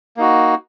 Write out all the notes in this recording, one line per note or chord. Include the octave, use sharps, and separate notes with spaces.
A#3 D#4 F#4